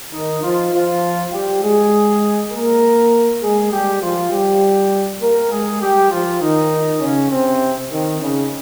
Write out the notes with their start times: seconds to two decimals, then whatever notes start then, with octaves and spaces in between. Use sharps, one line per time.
0.13 D#3 D#4
0.43 F3 F4
0.72 F3 F4
1.32 G3 G4
1.62 G#3 G#4
2.52 A#3 A#4
3.42 G#3 G#4
3.72 G3 G4
4.02 F3 F4
4.32 G3 G4
5.21 A#3 A#4
5.51 G#3 G#4
5.82 G3 G4
6.11 F3 F4
6.41 D#3 D#4
7.01 C#3 C#4
7.31 C3 C4
7.91 D#3
8.21 C#3